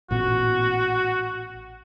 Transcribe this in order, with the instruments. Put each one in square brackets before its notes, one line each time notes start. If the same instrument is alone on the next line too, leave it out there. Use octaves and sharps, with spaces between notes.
[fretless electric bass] A1 A#2 B3 [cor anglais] F#4